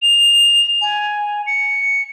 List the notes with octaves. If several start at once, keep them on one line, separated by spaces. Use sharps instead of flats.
F7
G#5
C#7